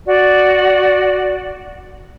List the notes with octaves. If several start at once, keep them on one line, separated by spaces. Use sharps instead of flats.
F#4 D5